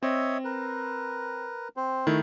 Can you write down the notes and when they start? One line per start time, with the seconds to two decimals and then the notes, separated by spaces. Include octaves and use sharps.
0.03 C4 C#5 D#5 E5
0.45 A#4 B4
1.77 C4 C5
2.07 D#3 A3 E4